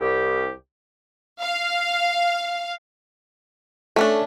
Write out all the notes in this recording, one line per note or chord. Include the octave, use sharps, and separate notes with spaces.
C2 G4
F5
A3 C#4 D4 A4